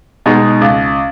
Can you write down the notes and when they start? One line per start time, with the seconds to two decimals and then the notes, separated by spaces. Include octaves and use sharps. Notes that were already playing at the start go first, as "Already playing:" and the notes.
0.26 B2 G#3 D#4 G#4
0.61 C#2